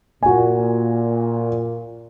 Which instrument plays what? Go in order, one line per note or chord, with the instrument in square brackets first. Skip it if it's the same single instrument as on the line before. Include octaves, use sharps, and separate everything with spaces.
[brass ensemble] A#2 [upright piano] F#4 G#5